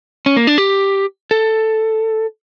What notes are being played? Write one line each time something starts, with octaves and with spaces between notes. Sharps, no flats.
C#4
A#3
D4
G4
A4